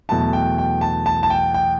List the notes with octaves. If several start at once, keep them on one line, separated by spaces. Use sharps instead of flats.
E2 B2 F#3 A3 A5
G5
G5
A5
A5
A5
G5
G5